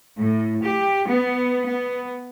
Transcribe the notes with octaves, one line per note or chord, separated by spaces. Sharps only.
A2
G4
B3
B3